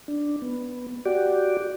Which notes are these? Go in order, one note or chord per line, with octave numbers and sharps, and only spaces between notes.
D4
B3
F#4 G4 D5